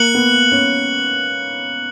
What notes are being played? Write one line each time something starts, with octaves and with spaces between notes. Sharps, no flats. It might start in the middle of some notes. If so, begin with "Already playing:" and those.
Already playing: A#3 F#6 C#7 F#7
B3
C#4